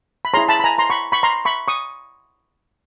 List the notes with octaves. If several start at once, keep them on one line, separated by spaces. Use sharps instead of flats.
B5
E4 G#4 C#5 A#5 C6
A5 B5
B5
G#5 A#5
A#5 C6
B5 C#6
B5 C#6
A#5 C6
B5 C#6
C#6 D#6